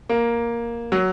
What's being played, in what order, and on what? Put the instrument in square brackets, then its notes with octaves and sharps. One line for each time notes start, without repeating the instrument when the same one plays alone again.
[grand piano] A#3
F#3